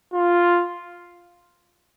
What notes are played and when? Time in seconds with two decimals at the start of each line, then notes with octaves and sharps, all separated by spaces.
0.13 F4